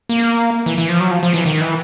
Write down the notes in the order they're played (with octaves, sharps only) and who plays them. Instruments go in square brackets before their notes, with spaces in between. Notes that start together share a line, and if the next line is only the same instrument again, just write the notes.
[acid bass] A#3
E3
E3
F3
F#3
F3
F3
E3
D#3
E3